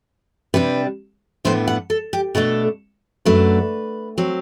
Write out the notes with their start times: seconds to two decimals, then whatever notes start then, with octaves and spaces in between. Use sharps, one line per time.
0.54 C3 G3 D4 B4
1.45 A2 E3 B3 D4 C5
1.68 F#5
1.90 A4
2.13 G4
2.35 B2 A3 D4 A4
3.25 F#2 F#3 A3 D4 B4
4.18 F#3 C4